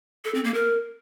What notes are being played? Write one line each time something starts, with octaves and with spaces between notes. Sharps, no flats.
A4
C4
A#3
A#4